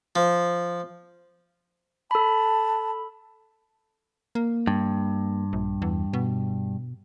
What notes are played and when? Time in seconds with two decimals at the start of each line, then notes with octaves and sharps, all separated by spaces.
0.16 F3
2.11 A4 A5 B5
4.35 A#3
4.67 G2
5.53 A#1
5.82 E2
6.13 B2